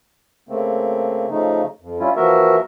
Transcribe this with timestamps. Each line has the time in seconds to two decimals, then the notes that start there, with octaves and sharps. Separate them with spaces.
0.49 C#3 A3 A#3 C4
1.31 C#3 F3 A3 D#4
1.81 F2
2.00 G3 C#4 E4 F4
2.16 E3 F3 A#3 F#4 A#4 E5